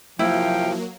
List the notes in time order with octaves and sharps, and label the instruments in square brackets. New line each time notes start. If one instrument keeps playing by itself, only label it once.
[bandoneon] C3 G5 [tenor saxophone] F3 [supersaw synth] F#3 A#3 [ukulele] E4